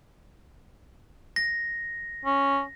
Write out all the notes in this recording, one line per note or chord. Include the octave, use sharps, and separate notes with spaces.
A#6
C#4